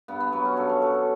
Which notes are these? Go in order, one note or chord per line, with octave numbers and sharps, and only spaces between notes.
G2 B3
B3
F#3 B3
C#4
G2 A4
C#5
F#3 A4
A4